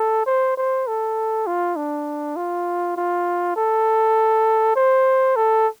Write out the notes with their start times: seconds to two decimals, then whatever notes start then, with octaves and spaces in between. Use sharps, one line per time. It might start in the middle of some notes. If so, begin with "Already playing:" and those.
Already playing: A4
0.26 C5
0.57 C5
0.87 A4
1.47 F4
1.76 D4
2.37 F4
2.96 F4
3.56 A4
4.76 C5
5.36 A4